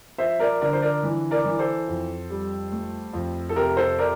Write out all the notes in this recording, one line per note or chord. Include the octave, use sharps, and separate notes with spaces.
F3 C5 E5
A#4 D5
D3 A#4 D5
C5
A#4 D5
E3
A#4 D5
E3
A4 C5
F2
G3
A3
F2
A4
C3 G4 A#4
A4 C5
C3 A#4 D5